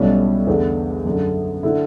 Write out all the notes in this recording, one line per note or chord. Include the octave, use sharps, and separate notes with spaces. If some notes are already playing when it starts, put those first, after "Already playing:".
Already playing: B1 A2 G3 C#4
E2 D3 A3
F#2 D3 A3
D3 A3 E4